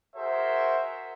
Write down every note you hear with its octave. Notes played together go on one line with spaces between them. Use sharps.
F#4 G#4 A#4 C5 E5